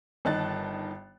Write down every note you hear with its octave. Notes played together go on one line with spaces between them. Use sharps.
G1 D#3 D#4 A5 F#6 A6